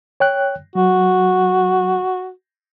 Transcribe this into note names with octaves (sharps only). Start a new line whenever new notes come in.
C#5 G5 F#6
F#3 F#4